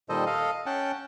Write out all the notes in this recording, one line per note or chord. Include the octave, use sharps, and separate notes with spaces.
A#2 D#3 G3 A4 C5 D#5
A4 D#5 F5
C#4 F#5 G5 A5